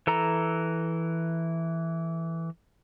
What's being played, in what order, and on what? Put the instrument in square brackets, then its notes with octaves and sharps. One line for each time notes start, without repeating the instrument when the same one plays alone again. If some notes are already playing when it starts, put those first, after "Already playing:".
[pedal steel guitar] E3 A4 A#5